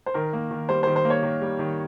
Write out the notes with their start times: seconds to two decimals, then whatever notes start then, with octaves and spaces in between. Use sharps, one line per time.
0.06 C5
0.14 D#3 A#4
0.33 A#3
0.51 D#3
0.69 G3 C5
0.83 C5
0.87 D#3
0.96 C5
1.05 A#3
1.10 C#5
1.23 D#3
1.41 G3
1.59 D#3